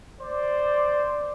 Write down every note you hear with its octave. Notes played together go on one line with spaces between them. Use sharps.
C5 D5